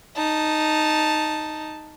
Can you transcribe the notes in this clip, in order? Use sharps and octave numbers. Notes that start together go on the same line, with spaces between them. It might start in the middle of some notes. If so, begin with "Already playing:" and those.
D#4 A5